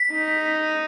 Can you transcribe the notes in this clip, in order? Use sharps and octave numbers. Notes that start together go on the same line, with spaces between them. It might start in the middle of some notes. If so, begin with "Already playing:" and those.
Already playing: B6
D#4